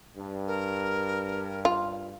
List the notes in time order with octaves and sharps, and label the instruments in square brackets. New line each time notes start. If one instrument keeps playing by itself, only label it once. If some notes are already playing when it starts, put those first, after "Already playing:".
[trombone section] G2
[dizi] A#4
[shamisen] F4